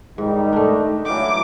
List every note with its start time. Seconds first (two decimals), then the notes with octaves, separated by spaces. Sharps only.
0.18 G#2 D#3 G3 D#4
0.53 A3 D4
1.06 E3 F#3 F5 G5 D6